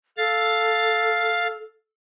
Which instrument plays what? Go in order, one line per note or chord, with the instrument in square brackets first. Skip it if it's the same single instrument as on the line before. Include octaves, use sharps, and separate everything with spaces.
[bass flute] A4 [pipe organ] F5 A6